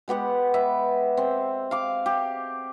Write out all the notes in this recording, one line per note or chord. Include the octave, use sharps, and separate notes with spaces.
G#3 B3 G4 F#5
B4 E5
C4
F5 D6
G4